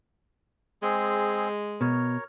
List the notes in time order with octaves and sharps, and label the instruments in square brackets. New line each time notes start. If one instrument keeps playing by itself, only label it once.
[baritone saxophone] G#3 [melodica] C4 G#4
[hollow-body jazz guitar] B2 [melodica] A#4 C#5